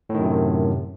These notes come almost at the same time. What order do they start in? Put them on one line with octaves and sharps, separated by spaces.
A2 D#3 F#2 C3